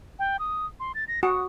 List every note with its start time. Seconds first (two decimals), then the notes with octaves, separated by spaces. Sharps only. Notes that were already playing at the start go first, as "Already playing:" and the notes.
0.19 G5
0.39 D#6
0.80 C6
0.95 A6
1.08 A#6
1.23 F#4 D#6